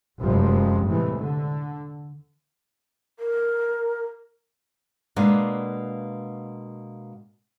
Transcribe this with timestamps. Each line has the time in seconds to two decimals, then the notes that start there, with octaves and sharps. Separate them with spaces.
0.20 F1 F#2 F3 G3 G#3
0.86 E2 A2 C3 E3 G#3 A3
1.17 D3
3.20 A#4
5.16 B2 G#3 A#3 B3 D4